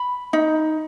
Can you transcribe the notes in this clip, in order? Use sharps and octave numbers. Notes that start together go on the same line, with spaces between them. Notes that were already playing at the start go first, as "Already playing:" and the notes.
Already playing: B5
D#4